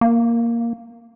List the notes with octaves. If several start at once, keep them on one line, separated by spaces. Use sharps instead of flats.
A#3